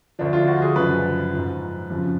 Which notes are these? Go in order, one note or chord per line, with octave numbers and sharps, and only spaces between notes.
D2 D3 F3 D4
F4
F#4
G#4
F#2 C#3 F3 B4
G#2 F3
F2 C#3 F3